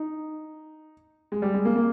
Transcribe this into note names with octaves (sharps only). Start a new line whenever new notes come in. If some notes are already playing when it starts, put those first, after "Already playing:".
Already playing: D#4
G#3
G3
G#3
A#3
A#3